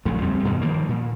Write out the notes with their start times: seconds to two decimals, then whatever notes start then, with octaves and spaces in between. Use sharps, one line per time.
0.05 A#1 F2 C#3 A3
0.22 E2 G3 C4
0.45 G2 B2 D#3
0.62 D#3 F3 G3 A#3
0.89 A#2